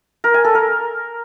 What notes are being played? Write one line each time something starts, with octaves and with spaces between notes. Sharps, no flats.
A#4
G#5
A4
A#4